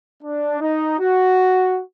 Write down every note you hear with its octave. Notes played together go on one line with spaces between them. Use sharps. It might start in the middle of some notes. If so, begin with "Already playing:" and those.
D4
D#4
F#4